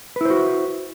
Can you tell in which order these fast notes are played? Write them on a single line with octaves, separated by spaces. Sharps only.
B4 E4 C5 F#4